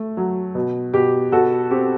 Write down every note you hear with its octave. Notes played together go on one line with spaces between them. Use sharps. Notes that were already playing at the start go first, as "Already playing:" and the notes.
Already playing: A3
F#3
B2
B2 G4
B2 F#4 A4
C4 G4